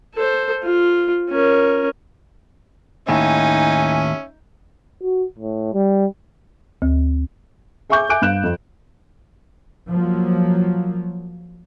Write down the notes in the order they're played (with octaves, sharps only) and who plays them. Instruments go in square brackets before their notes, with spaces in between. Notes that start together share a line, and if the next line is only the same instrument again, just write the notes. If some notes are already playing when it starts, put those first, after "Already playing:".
[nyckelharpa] A4 C5
F4
C#4 A#4
[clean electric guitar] D#2 A2 [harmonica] C#4 E5 [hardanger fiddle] D#4 [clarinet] G#5
[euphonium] F#4
A2
G3
[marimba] D2
[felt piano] G#4 E5 G#5 C#6 D6 G6
E5 G#5 D6 F#6 D7
G2 F5 F#6 E7
F2
[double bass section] F3 F#3 A#3